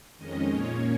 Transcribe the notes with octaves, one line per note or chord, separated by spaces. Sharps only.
F2 D#3 G#3 C#4 D#5
A#2 A#3 C#4 C#5